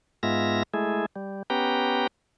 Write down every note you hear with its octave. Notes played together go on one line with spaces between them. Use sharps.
G#2 G#3 B3 F4 E5 A#6
G#3 A3 E4 G#4
G3
B3 C#4 G4 B4 G5 A#5